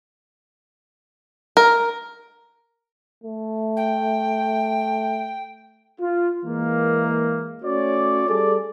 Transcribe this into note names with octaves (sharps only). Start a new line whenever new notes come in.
A#4
A3
G5
F4
E3 G#3 A#3
A3 C#4 F#4 C#5 D5
G3 G#4 A4 D5